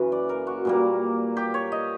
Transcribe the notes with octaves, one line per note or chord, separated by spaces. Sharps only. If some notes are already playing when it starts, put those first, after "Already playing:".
Already playing: F#2 C#3 E3 B4
D5
A#4
F#4
A#2 G3 A#3
G4
C#5
D#5